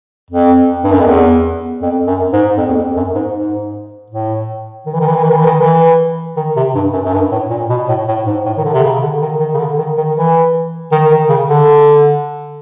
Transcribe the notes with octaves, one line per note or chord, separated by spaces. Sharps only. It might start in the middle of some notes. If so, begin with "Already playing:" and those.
F2
G2
F#2
F2
E2
F2
F#2
G#2
F2
E2
F2
F#2
G#2
G#2
A2
D#3
E3
D#3
E3
D#3
E3
D#3
E3
D#3
E3
D#3
C3
G2
F#2
F#2
G2
A2
A#2
B2
A2
A2
G#2
A2
D#3
D3
C3
C#3
D3
D#3
D#3
C#3
D3
D#3
D#3
E3
D#3
D#3
C#3
D3